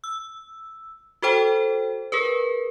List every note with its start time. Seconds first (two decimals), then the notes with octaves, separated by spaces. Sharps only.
0.04 E6
1.22 F#4 A4 C5 G5
2.12 G#4 A#4 B4